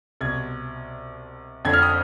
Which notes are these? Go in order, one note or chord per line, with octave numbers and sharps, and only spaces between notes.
C2 B2 G#6
F2 D3 G#6
F6
D#6